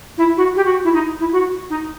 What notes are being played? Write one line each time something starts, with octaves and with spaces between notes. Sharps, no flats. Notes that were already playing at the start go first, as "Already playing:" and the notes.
E4
F#4
G4
F#4
E4
D#4
E4
F#4
D#4